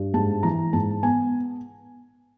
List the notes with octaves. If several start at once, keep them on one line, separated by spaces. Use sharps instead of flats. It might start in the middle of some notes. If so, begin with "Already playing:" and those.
Already playing: G2
G#2 A5
E3 A#5
G#2 A5
B3 G#5